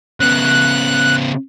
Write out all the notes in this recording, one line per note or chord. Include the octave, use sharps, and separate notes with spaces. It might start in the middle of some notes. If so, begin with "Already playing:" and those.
C#3 B3 F#6